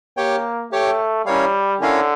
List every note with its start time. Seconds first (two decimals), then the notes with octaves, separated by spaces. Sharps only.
0.17 A#3 G4 C#5 G5
0.72 A3 G4 C#5 G5
1.26 G3 C#4 E4 A#4 C#5 F5
1.81 D3 C#4 E4 A#4 C#5 F5